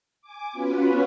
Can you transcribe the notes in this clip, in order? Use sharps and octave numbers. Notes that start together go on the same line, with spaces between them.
G#5 D6
B3 C#4 F4 F#4 B4